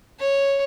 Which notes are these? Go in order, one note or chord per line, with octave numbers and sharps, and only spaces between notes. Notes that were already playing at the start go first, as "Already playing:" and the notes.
C#5